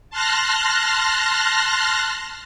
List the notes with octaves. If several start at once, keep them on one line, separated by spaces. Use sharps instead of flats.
A5 C6 F6 F#6 A#6